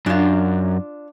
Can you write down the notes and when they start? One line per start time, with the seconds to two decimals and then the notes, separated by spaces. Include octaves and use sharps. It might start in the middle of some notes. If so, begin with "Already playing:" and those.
0.06 F#2 D4 F4